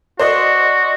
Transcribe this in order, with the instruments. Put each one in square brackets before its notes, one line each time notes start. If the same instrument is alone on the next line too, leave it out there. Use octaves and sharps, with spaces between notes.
[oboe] F#4 [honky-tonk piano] C5 D5 D#5